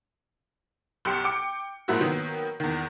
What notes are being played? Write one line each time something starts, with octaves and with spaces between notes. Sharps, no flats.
B1 G4 C6 C#7
G5 D6 C#7
G#2 F3 F#3 A#3 E4 F#4
D#3 F#3 A#3 B3
E2 D#3